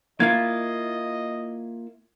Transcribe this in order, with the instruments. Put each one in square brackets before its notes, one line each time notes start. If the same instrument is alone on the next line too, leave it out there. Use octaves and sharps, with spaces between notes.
[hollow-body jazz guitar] A#3 E4 F4 [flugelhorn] D#5 [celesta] G#6